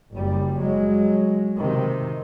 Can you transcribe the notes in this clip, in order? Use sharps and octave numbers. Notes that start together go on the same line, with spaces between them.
F#1 G3
F#3 G#3
C3 D#3